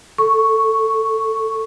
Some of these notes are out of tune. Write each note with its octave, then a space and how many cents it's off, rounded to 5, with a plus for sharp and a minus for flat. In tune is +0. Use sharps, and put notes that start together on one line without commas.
A4 -10 C#6 +0